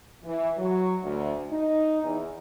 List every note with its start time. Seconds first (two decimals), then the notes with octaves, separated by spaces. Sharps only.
0.24 E3
0.57 F#3
1.02 D2
1.50 D#4
2.03 E2